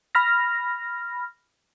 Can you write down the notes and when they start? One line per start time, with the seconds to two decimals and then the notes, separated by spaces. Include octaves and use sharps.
0.15 B5 F6 A#6